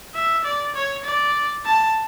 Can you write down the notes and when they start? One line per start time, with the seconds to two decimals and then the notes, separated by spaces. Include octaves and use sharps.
0.15 E5
0.44 D5
0.75 C#5
1.04 D5
1.66 A5